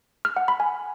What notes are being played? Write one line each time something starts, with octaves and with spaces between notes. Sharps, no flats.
F6
F#5
B5
G#5